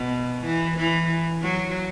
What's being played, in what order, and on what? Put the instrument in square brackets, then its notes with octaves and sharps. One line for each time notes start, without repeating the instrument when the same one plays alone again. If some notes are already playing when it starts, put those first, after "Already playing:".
Already playing: [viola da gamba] B2
E3
E3
F#3